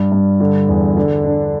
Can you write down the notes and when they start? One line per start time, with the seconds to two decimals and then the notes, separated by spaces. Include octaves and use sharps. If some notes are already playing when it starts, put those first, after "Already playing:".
Already playing: G2
0.12 G2
0.40 D3
0.69 E2
0.97 D3
1.24 D4